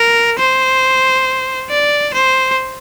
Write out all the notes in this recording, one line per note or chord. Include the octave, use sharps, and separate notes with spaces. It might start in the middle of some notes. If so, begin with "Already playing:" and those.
Already playing: A#4
C5
D5
C5